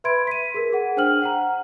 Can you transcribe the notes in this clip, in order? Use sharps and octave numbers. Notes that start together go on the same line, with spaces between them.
B4 E5 B5 C6 G#6 D7
B6 D#7
G#4 A#4
G#4 F#5
D4 C5 G5 F6 F#7
F#5 G5 A#5